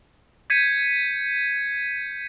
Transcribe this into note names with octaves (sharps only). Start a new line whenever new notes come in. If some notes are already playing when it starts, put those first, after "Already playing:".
G6 G#6 B6 C#7 D#7